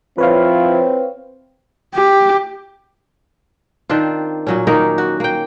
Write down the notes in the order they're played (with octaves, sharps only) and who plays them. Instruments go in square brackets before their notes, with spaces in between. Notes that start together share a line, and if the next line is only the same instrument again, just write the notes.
[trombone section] F3 E4 F4 [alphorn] C4 [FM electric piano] B4 C#5 F5
[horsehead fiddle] G4
[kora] D#3 C4 D4 F4
A#2 F#3 C#4
D#3 A#3 D#4 A#4
F#4
A#3 G5